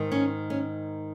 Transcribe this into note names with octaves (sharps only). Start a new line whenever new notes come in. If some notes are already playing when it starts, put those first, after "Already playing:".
Already playing: G#2 D#3
C#4
C#4